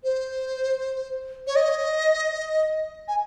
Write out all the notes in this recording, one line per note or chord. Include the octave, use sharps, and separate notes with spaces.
C5
C#5
D#5
G#5